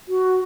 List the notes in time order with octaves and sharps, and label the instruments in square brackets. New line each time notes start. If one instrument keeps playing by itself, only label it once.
[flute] F#4